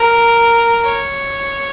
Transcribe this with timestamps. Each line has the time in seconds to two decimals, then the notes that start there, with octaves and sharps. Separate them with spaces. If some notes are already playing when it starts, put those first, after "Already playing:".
Already playing: A#4
0.84 C#5